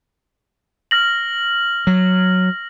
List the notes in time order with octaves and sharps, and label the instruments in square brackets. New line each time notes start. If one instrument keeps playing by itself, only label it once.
[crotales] F6 A#6 F#7
[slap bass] F#3